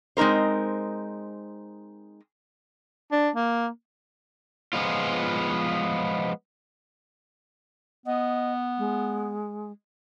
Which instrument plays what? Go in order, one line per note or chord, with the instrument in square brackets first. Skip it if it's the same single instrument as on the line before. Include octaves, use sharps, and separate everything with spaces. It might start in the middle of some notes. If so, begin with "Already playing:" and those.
[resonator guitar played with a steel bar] G#3 C4 D#4 A#4 C5
[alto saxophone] D4
A#3
[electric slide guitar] F3 G#3 B3 F4
[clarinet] B3 [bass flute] D#5
[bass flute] G#3